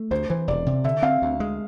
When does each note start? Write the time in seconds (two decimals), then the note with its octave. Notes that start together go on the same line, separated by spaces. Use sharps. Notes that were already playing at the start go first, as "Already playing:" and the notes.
Already playing: A3
0.11 D2 C5
0.30 E3 C5
0.48 E1 D5
0.66 C3
0.84 D3 E5
1.02 C4 F5
1.22 D2
1.40 G#3